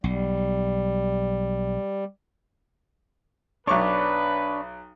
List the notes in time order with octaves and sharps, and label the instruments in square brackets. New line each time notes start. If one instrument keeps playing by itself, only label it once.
[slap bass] B1 [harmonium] G3
[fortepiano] B1 C#6 D6 [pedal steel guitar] D4 C#5 D5 [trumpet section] B4